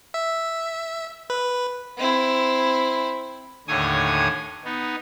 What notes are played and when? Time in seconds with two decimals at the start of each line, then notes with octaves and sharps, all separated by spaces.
0.14 E5
1.30 B4
1.97 C4 E4
3.68 D#2 A2 D3 C#5 G#5 D#6
4.65 B3 D#4